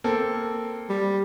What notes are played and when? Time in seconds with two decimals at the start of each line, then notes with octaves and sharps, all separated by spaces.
0.04 A#3 C4 A4
0.90 G3